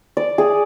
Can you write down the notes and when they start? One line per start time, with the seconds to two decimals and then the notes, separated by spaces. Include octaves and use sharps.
0.17 D5
0.38 G#4